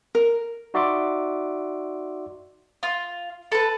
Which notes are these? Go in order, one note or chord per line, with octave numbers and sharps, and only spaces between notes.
A#4
D#4 F#4 D5 E5 C6 D6
F4
A4 B4